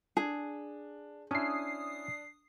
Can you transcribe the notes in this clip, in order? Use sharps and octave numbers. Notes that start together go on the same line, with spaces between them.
D4 G#4
C#4 D4 E4 D#6 C7